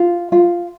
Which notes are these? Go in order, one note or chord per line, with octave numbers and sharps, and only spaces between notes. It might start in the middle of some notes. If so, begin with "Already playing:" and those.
Already playing: F4
F4